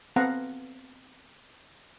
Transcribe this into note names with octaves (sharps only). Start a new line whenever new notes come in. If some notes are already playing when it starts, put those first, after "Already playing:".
B3 C4 A4 F5 F#5 A#5